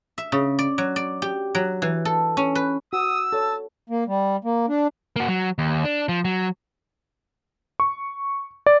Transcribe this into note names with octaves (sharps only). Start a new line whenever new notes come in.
E5
C#3
D5
F#3
D5
G4
F#3
E3
A4
C#4
B4
F#4 D#6 E6
A4 C#5 A5
A#3
G3
A#3
D4
A#3 F#4
F#3
D#2
D4
F3
F#3
C#6
D5